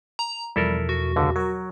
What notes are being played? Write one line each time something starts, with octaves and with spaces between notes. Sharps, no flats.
A#5
E2 B2 F3 G3 E4 A4 A#4
F#4
C#2 D3
F#3 A#4 C#5